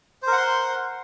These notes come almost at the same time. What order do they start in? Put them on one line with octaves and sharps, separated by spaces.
C5 A#4 F#5 C6